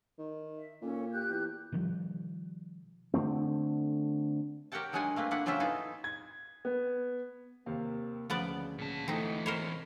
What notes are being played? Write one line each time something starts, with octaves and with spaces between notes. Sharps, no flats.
D#3
E5
A#2 C#4 A4
G4 F#6 G6
E2
B2 D#3 F3 G3
D3 E3 A3 C4
G4 A#4 C#5 F#5 G5 A5
D#3 F#3 G#3 D4 F#5 G#5
A3 A#3 C4 B4
A#3 D4 E4 B4 F#5
C#3 F#3 F4 C5 E5 G5
B3 D#4 E4 G#4 A4
G#6
B3
D#2 C3 A#3 F5
D2 C#3 F3 B3 D5
A#2 C#3 A5
B2 E3 A3 C4 D#4
C4 A#4 C5 C#5 B5